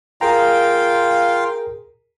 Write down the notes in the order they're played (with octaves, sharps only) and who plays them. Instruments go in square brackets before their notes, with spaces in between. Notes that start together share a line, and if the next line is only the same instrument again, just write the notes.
[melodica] F4 F5 G5 [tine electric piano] G#4 A#4 A#5